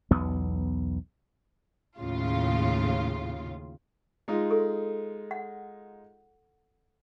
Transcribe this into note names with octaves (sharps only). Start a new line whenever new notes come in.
B1 E2 B3
D#2 A2 C#3 F4
G#3 D#4 F4
A4
F#5